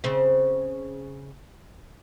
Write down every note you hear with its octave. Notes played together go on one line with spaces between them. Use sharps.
C#3 C4